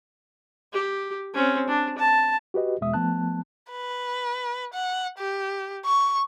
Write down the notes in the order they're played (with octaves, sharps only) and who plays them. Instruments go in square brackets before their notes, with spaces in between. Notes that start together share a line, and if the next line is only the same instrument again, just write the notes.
[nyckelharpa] G4
C4 C#4
D4
A5
[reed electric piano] F#4 G4 B4 D#5
E2 B2 G#3 E5 D#6
F3 A3 B3 A5 F#6
[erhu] B4
F#5
G4
C#6